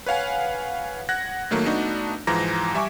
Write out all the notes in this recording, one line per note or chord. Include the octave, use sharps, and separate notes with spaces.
B4 C#5 F5 F#5 G#5
F#5 F#6 G#6 A#6
A2 D#3 F#3 A3 A#3
A3 B3 D4 D#4 F#4
G#2 E3 F3 A#5 A#6
G3 E5 G#5 C#6 D6